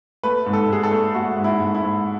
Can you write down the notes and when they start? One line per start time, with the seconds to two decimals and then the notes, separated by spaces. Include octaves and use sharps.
0.23 A3 B4
0.46 G#2
0.53 A4
0.68 G#2 G#4
0.83 A4
0.91 A3
1.15 A3 F#4
1.37 G#2
1.44 E4
1.60 G#2
1.75 E4
1.82 G#2